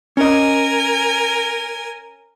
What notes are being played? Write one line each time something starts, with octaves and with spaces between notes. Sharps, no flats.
C#4 A#4 D#5 G#5